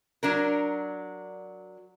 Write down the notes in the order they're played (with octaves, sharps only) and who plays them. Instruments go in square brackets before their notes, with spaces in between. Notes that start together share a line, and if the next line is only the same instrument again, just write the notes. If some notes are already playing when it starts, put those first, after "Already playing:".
[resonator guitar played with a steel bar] F#3 D4 A#4